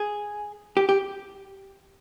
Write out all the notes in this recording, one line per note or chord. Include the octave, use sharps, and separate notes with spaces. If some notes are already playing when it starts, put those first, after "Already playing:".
Already playing: G#4
G4
G4